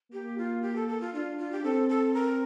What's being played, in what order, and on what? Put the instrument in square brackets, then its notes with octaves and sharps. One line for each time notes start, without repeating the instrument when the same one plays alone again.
[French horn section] A#3 [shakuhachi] G4
[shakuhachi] F4
G4
A4
A4
F4
[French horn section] D4 [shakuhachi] F4
[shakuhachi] F4
G4
[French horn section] C4 [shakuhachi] A4
[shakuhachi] A4
A#4